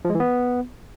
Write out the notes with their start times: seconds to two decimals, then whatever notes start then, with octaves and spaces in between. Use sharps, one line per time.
0.05 F3
0.10 G#3
0.15 E3
0.20 B3